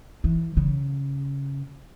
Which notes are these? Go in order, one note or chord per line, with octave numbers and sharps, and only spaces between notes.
E3
C#3